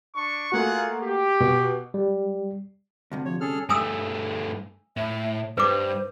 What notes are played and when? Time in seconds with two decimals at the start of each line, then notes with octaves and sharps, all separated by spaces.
0.14 D4 C#6
0.52 A3 A#3 F4 F#4 G#4 F#5
1.02 G4
1.40 B2
1.94 G3
3.12 D2 G2 C3
3.25 F3 C#5
3.41 C#4 G#4 A4 F6
3.69 G2 A3 G#5 D#6 E6
4.97 A2 E5
5.58 G2 B4 C5 D6